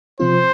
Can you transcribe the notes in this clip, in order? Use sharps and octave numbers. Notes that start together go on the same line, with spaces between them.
C3 F3 C4 F4 C5